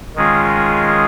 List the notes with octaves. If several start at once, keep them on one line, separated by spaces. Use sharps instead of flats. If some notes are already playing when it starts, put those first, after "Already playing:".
D#3 G#3 C#4 F4 G#4